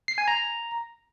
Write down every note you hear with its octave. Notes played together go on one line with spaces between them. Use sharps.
C7
G#5
A#5